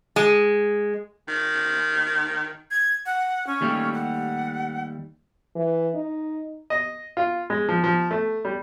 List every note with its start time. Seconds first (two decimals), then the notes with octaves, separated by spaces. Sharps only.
0.16 G#3
1.28 D#3
2.71 G#6
3.06 F#5
3.47 C#4
3.61 D#2 G3 A3
3.93 F#5
5.56 E3
5.95 D#4
6.70 D#5
7.17 F4
7.50 G#3
7.68 F3
7.84 F3
8.11 A3
8.45 G3